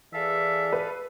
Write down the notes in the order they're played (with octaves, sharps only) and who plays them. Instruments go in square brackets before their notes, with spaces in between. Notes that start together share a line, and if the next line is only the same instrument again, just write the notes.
[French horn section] E3 G#4 D5 [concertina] A4 F5 [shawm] E5
[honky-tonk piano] B4